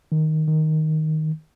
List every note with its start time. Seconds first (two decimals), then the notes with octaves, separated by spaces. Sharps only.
0.12 D#3
0.48 D#3